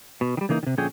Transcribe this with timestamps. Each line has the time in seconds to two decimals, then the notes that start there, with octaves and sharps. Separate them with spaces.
0.21 B2
0.37 D#3 G3
0.49 C#3 E3 A#3 D#4
0.63 C3 D#3
0.78 A#2 D3 F3 C#4 G#4 G5